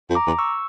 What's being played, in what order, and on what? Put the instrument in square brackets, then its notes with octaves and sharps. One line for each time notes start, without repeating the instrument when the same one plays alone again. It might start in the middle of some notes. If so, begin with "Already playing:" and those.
[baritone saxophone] F2
[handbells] A#5 D6
[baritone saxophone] E2
[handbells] C#6 E6